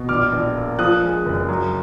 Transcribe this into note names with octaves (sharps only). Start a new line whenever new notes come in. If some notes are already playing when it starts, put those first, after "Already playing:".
Already playing: B2
A#1 D6 F6
A#1
A#3
F3 D#6 F#6
G#3
F#1
F#3